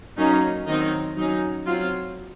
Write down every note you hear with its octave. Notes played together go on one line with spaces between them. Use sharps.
F#3 A#3 C#4 D#4
D#3 F#3 C4 D#4
F#3 C#4 D#4
F#3 C4 F4